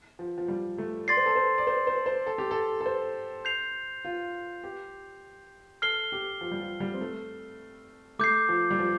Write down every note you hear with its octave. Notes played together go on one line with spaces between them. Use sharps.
F3
F3
G3
A3
D5 C6 A6 C7
C5
A4
C5
D5
C5
C5
C5
A4
G4
A4
A4
C5
G6 C7 F7
F4
G4
A4 F6 C7 G7
G4
F3
G3
F3
G3
C4
A3
A3 D6 G6 C7
F3
G3
F3